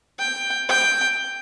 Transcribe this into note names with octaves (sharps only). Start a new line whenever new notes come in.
G5
G5